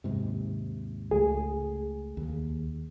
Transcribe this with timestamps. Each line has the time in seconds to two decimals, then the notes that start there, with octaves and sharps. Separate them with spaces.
0.04 D#2 G#2 C3
1.11 C#2 A3 G#4
2.17 D#2